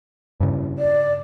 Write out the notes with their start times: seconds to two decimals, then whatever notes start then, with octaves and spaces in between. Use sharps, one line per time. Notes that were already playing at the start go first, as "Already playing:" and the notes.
0.40 G2 C#3
0.78 D5